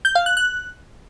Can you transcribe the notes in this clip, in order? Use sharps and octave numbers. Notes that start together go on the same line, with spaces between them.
G6
F5
F#6
F#6